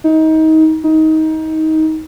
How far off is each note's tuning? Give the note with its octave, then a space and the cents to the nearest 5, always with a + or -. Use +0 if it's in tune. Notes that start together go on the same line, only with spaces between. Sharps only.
D#4 +25
D#4 +20